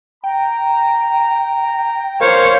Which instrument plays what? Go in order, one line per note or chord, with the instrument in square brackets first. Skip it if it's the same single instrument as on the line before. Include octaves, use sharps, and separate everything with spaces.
[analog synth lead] G5 [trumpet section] A#5
[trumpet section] A#3 C#4 [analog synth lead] A#4 [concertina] C5 F5 [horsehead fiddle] C#5